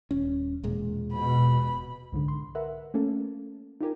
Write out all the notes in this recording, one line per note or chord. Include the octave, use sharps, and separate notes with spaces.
D#1 C#4
E1 A#2 G#3
B2 B5
C2 G#2 D3
C6
A#4 B4 E5 F#5
A3 A#3 C#4 A4
D#4 F4 G4 A#4 G#5